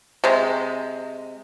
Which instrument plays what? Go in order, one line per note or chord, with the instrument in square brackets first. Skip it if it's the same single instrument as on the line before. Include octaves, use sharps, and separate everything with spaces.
[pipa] C3 G#3